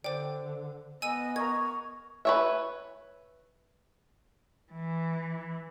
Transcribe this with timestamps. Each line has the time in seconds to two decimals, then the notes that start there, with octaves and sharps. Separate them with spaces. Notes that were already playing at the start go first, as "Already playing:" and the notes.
0.04 D3 C5 D5 G5
1.02 B3 D#5 G#5 E6 D#7
1.36 A#4 D#5 A#5 C#6 G#6
2.25 B4 C#5 E5
4.71 E3